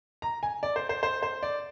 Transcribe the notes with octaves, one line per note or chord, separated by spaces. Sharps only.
A#5
G#5
D5
C5
C5
C5
C5
D5